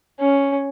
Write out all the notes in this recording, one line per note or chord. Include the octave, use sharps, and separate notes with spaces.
C#4